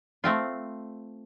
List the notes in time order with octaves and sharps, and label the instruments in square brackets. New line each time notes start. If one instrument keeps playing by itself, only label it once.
[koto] A3 C4 F4